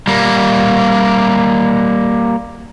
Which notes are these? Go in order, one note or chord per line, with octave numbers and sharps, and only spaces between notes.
G3 A#3